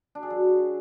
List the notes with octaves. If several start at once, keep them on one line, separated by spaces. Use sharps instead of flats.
D4
G#4
F#3